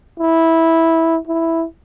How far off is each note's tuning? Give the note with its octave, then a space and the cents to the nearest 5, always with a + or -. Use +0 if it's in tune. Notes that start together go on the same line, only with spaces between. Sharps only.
E4 -10
E4 +0